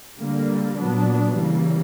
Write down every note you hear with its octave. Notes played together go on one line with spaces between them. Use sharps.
D3 G3 A#3
A#2 F#3 B3 D4
C#3 E3 G3 A#3